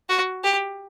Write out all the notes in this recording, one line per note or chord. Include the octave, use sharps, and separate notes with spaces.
F#4
G4